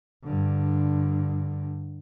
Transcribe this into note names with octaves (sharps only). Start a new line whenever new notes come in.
G2 D3